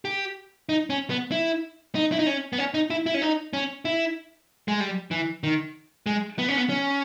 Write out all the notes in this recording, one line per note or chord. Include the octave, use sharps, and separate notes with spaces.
G4
D#4
C#4
B3
E4
D#4
E4
D#4
C#4
B3
C#4
D#4
E4
E4
C#4
D#4
C#4
E4
G#3
G3
E3
D#3
G#3
B3
C#4
B3
C#4